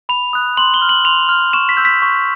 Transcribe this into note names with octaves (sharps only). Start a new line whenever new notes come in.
B5 F7
D#6 F#6
C6 F#7
G7
F6
F#7
C6 F7
F6
C#6 E7
B6
E6 G6
B6
C#6